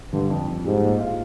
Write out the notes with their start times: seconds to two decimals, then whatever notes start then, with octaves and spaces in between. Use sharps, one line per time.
0.13 G2 D3
0.30 F2
0.48 F2
0.65 G#2 G3
0.83 A#2
1.00 F4